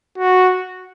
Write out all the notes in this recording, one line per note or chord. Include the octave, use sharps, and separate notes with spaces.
F#4